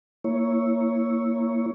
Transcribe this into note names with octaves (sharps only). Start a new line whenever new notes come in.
A#3 E4 C#5